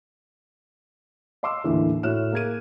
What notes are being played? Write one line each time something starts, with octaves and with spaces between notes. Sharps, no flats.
D#5 F5 C6 D6 E6
D#2 A2 D3 E3
A2 F#4 C#5 F6 F#6 E7
A#3 G#4 G#6 D#7